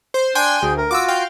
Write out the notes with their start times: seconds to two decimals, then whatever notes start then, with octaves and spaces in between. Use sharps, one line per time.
0.14 C5
0.35 D4 G5 G#5 C6
0.63 D2 G#4 G5
0.77 A#4
0.91 F4 F#4 D6 E6
1.08 F5 G5